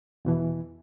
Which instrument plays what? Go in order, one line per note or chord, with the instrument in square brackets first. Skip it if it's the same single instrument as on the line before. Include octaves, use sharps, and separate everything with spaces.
[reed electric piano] E2 B2 E3